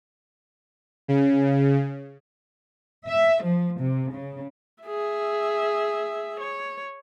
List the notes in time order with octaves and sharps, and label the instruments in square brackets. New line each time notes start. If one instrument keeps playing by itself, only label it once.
[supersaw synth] C#3
[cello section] E5
F3
C3
C#3
[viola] G#4 E5
C#5